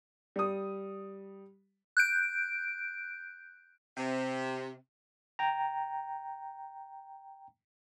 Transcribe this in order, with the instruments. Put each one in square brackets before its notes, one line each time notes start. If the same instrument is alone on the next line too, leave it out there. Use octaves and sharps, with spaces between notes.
[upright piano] G3 D#6
[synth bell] F#6 G6 D7
[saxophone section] C3
[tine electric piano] G5 A#5